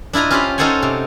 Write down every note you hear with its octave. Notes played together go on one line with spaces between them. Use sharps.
D4 E4 F4 D#5 A#5
C#4 F4 G4 C5 F5 B5
C#4 D#4 A4 C5 F#5 G#5
C3